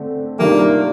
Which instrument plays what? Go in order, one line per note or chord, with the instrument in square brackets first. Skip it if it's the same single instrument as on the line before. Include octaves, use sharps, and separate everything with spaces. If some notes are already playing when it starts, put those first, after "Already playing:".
Already playing: [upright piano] D3 A3 C4
[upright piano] C3 D#3 G3 D4 F4 [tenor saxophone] A#3